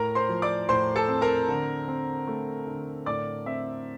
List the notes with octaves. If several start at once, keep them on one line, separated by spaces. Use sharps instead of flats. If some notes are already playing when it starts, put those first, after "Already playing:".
Already playing: A2 A#4 A#5
C5 C6
F3
D5 D6
A2 C5 C6
A4 A5
C4
A#4 A#5
D3
C4
A3
D3
A2 D5 D6
C4 E5